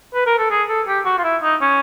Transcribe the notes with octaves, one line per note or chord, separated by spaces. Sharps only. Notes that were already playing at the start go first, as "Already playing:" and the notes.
B4
A#4
A4
G#4
A4
G4
F#4
F4
E4
D#4
C#4